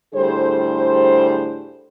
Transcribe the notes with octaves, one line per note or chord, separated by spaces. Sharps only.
A2 D3 G3 G#4 C5